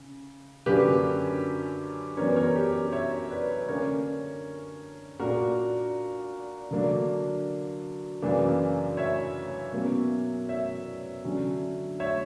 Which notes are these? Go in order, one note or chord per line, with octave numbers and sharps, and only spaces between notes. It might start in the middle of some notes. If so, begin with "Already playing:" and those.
Already playing: C#3
F#2 D3 A#3 C#4 G4 B4
F#2 E3 B3 D4 A#4 C#5
A#4 C#5
G4
C#5 E5
B4 D5
D3 A#3 C#4 A#4 C#5
A#2 A#3 D4 F#4 A#4
D3 F#3 A#3 D4
F#2 C#3 E3 A#3 D4
C#5 E5
B2 F#3 A#3 C#4
C#5 E5
D3 F#3 C#4
C#5 E5